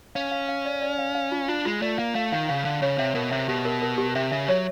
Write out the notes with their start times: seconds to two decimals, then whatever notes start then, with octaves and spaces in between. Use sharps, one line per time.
0.15 C#4 F5
0.31 F5
0.49 F5
0.65 D5
0.82 D5
0.99 F5
1.15 F5
1.32 F4
1.48 D4 F4
1.65 G#3 F4
1.82 A3 D5
1.98 A#3 F5
2.15 A3 F5
2.32 D#3 F5
2.49 C#3 F5
2.65 D3 F5
2.82 C#3 C#5
2.98 C3 E5
3.15 B2 A#4
3.31 C3 E5
3.48 B2 G4
3.65 A#4
3.82 A#4
3.98 G4
4.15 C3 E5
4.32 C#3 E5
4.48 F#3 C#5